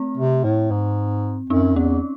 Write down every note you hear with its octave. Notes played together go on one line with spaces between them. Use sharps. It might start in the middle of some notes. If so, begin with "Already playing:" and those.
Already playing: A3 C4
C3
A2
G#2
F#2 C4 D#4
E2 C#4